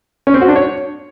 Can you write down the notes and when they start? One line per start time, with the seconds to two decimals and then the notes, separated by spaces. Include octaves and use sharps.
0.27 C#4
0.34 C4
0.41 F#4
0.49 D4
0.56 C#5